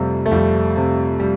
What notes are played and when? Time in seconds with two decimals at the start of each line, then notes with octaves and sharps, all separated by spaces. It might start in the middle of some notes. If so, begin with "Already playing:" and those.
Already playing: F2 C3 G3 A3
0.26 A3
0.31 F2 G3
0.77 C3 G3
1.20 G3